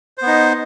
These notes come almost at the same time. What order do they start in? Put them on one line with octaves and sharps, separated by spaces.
C5 B3 D#4